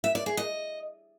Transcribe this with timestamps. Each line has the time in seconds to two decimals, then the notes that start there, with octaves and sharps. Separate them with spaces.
0.04 E5
0.15 D5
0.26 G#4
0.37 D#5